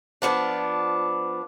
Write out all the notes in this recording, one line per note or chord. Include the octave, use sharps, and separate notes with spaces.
F3 B3 D4